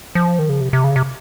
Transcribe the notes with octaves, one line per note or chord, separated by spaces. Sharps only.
F3
D#3
C#3
C3
C3
C#3
C3